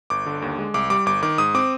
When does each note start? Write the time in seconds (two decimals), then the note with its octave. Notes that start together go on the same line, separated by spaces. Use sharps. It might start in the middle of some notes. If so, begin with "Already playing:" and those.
0.10 G1 D6
0.26 D3
0.42 D#2
0.59 G#3
0.74 C2 D6
0.90 G3 D6
1.06 G1 D6
1.23 D#3 D6
1.38 G#2 D#6
1.55 C4 D6